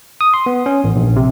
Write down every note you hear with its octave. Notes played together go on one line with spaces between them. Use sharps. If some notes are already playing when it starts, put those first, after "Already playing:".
D#6
C6
B3
C#4
A1
A#1
C3